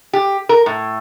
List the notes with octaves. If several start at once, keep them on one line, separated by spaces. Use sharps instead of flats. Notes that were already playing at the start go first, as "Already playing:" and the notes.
G4
A#4
A2